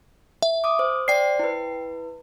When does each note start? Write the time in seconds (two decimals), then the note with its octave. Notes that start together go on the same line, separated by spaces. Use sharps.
0.42 E5
0.64 D6 D#6
0.79 C5
1.08 C5 D5 G5 C7
1.39 E4 B4